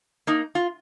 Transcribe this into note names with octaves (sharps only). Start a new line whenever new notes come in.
A#3 D#4
F4